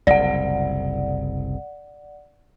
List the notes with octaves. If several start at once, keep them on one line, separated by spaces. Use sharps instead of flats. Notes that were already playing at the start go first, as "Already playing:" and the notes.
F#1 C2 D5 F#5